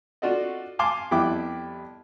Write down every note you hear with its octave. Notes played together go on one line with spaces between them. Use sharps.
D4 F4 F#4 A4 D5 D#5
F5 G#5 A5 C6 D6
F2 G3 B3 E4 G5 D6